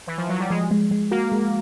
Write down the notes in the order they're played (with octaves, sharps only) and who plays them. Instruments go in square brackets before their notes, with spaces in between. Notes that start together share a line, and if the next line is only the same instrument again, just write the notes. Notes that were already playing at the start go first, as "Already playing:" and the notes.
[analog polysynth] E3
F3
F#3
G3
[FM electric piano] F3 [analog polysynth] G#3
[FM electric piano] G#3
G#3
[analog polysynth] A#3 [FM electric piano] F#4
[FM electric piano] G#3